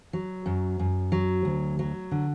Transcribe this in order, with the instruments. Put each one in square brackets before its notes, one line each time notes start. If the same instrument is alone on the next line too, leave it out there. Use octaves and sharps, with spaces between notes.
[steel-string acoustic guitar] F#3
F#2
F#2
F#3
D2
F#3
D3